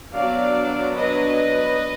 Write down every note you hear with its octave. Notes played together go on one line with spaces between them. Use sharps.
F#3 B3 D4 D5 F5
B4 D#5